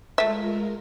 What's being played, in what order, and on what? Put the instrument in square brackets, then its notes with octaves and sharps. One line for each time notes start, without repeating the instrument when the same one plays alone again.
[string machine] G#3 F4 A#4 [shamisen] A3 E5